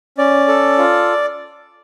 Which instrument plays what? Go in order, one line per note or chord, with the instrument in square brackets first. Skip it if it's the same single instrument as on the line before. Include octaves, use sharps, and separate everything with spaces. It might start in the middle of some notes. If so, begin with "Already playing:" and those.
[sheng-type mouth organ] C#4 D5
A4
F4